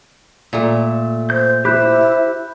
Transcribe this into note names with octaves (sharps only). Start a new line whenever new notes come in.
A#2 A3
C5 G6
E4 G4 C5 B5 F#6 G6